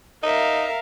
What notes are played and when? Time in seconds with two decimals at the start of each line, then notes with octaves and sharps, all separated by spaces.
0.23 D#4 A#4 E5 F5